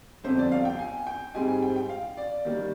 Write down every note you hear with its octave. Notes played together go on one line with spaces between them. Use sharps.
G1 F2 C3 C5
D5
F5
G5
G#5
G5
G#2 G3 C4 D#4 G#5
G#5
G5
G5
F5
D5
D#2 D#3 G3 A#3